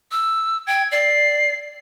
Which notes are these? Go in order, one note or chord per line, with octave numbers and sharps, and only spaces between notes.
E6
G5 G#6
D5 C7